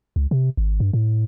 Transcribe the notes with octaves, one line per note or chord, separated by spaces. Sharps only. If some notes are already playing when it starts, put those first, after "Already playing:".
C#2
C3
G#1
G2
A2